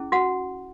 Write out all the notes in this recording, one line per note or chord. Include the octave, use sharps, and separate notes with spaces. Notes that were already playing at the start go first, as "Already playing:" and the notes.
Already playing: C#4 E4 G#4
F#4 F#5